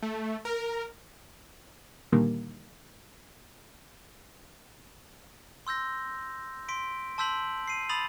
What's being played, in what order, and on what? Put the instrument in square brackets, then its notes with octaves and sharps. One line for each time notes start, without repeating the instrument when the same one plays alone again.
[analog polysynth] A3
A#4
[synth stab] A#2 D3 D#3 G3 A#3
[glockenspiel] C6 E6 G6 A#6
C6 B6 D7
A5 C6 E6 G6 B6 F#7
C7 D#7
B5 D#6 A6 F7 F#7